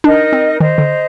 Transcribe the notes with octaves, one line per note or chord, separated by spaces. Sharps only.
D4 D#4 A#4 D#5
C4
D#3 C5 D#5 A#5
D3